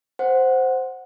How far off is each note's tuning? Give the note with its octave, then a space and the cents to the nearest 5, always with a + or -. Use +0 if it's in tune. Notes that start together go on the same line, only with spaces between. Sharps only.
C5 +0 F#5 +0